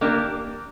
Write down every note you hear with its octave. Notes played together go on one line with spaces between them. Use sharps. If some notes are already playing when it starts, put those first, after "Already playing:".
A#3 D4 G4 A#4